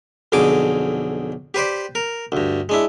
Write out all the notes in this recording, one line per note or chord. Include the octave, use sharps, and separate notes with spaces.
B1 F2 D3 G#4 D6
G4 B4 C5 D5
A#4
D2 G2
G#3 D4 E4